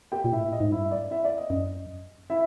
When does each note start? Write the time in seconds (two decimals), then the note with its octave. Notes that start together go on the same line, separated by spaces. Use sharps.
0.12 G4 G5
0.24 A#2
0.32 A2 E4 E5
0.52 D#5
0.60 G#2
0.72 G2 E4 E5
0.91 D5
1.11 E4 E5
1.25 D5
1.38 D#5
1.50 F#2 D#5
2.30 E4 E5